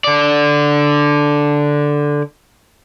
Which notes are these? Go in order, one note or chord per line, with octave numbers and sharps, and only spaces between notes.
D3 D5